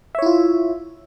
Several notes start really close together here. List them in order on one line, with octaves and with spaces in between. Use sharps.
E5 C#5 E4 F4